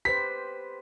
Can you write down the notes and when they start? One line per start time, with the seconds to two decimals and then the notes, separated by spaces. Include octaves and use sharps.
0.05 G4 B4 C5 B6